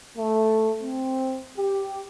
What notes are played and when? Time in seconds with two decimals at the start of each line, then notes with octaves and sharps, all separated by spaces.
0.17 A3
0.83 C4
1.57 G4